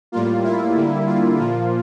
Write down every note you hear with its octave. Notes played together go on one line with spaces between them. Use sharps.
A2 G3 A#3 F4
E4
D3 G3 A#3
F4
A#2 F3 A#3 F4